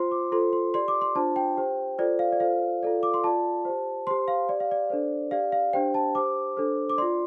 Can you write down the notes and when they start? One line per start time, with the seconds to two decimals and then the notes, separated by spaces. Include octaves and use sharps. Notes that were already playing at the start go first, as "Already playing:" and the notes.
Already playing: F4 C5 C6
0.11 D6
0.32 F4 A4 C5 C6
0.53 C6
0.74 G4 D5 C6
0.88 D6
1.01 C6
1.15 D4 F4 C5 A5
1.36 G5
1.57 G4 C5
1.98 F4 A4 C5 D5
2.19 F5
2.32 D5
2.40 F4 A4 C5 F5
2.83 F4 A4 D5
3.03 D6
3.14 C6
3.24 F4 D5 A5
3.65 G4 C5
4.07 G4 C5 C6
4.28 F5
4.49 G4 D5
4.60 F5
4.71 D5
4.90 D4 A4 C5
5.31 G4 D5 F5
5.52 F5
5.73 D4 G4 C5 G5
5.94 A5
6.15 G4 C5 D6
6.57 D4 A4 C5
6.90 D6
6.98 F4 D5 C6